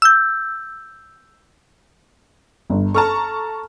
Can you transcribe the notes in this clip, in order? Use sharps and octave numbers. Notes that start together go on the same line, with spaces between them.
E6 G6
G1
A4 A5 A#5 C#6 F6